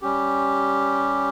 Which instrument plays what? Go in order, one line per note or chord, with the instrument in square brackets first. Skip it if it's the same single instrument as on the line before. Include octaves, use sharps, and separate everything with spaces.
[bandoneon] G3 C#4 G4